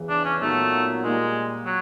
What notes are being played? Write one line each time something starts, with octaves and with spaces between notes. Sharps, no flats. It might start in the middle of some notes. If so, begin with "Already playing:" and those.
Already playing: E2 C#3 E3
D4
C#4
A#2 F#3 A3 B3 D#4
A#2 G3 G#3 A#3
F#3